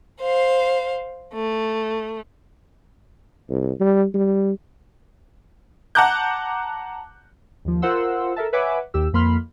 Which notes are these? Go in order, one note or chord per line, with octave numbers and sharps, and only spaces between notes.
C5 F5
A3
C2
G3
G3
F#5 A5 A#5 D6 F#6 G6
D#2 F3
F4 A#4 C5 F#5 C6 E6
A4 A#4 E5 A5
B4 C#5 E5 F#5 G#5 D6
D#2 G4 E6
F2 A#3 B5 C6 F6